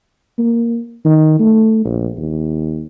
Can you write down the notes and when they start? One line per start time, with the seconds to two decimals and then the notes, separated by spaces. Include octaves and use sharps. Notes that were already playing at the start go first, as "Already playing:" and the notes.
0.38 A#3
1.05 D#3
1.39 A3
1.85 A#1
2.17 D#2